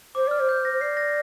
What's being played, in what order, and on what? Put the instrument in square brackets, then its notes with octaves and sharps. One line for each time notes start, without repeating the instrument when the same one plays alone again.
[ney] C5 [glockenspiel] D6
[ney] D5 [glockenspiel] F6
[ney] C5
[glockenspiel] G6
A#6
[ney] C5
[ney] D5 [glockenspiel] C7
[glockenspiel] A#6